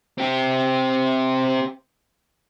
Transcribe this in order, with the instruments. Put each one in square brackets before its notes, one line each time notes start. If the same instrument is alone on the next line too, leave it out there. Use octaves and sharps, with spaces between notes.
[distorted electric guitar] C4 G4